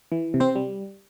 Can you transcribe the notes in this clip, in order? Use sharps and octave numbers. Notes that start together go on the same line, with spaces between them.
E3
C3
C4 C5
G3